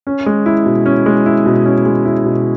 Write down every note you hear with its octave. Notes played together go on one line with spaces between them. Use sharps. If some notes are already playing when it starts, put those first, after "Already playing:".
C#4
G#3
E4
B2
C#4
G#3
E4
B2
C#4
G#3
E4
B2